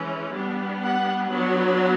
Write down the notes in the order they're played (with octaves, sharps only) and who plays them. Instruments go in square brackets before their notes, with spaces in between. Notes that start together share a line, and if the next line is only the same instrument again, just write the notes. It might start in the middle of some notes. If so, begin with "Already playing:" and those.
Already playing: [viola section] E3 G#3 C#4
G3 B3 D4
F#5
F#3 B3 D4